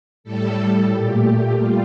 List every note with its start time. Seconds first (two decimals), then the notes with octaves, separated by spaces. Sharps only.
0.24 A2 G3 A4
0.89 A#2 A3 G4
1.53 G3 F4